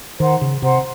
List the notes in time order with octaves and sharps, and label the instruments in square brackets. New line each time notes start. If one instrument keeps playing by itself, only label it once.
[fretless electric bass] D#3 [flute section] C5 F#5 A#5
[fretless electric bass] C#3
[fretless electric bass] C3 [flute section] C5 F#5 A#5